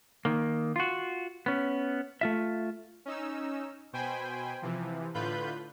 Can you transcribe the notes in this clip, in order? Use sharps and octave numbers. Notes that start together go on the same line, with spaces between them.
D#3 A#3
F4 F#4
B3 C#4
A3 F4 E5
C#4 D#4 E6
B2 C5 G5 G#5 B5
C3 E3 F3
A2 D3 F4 B4 B5 G6